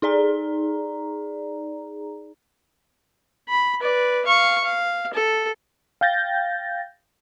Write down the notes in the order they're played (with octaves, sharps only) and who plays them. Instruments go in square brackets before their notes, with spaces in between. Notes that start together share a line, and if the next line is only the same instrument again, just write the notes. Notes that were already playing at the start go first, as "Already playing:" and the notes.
[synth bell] D#4 G#4 D5 A#5
[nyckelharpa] B5
B4 D5
F5 C#6
F5
A4
[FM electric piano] F5 G5 G6 A6 A#6